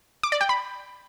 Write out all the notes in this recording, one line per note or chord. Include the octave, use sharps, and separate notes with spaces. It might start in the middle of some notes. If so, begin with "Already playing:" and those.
D6
D5
G5
B5